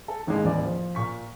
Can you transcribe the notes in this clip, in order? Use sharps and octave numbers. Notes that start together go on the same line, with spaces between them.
A4
G#1 D#2 A2 G#3
D#1 A1 E2 A2 D5
F3
A#2 C#6 B6